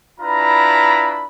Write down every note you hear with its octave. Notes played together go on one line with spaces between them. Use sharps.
D4 E4 F4 B4 A#5 B5